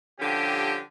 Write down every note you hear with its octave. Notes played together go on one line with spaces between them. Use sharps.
D3 F3 G3 C#4 G4